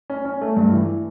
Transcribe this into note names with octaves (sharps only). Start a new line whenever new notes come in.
C#4
C#4
A3
G2
E3